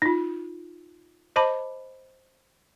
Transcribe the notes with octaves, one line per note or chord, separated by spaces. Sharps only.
D#4 F4
C5 D#5 A5 B5 D6